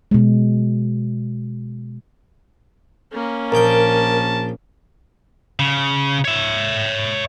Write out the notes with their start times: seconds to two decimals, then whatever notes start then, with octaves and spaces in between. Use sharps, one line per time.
0.11 B2 G#3
3.12 A#3 C#4
3.52 A#1 A#4 G5 A5
5.59 C#3
6.25 C#5 E5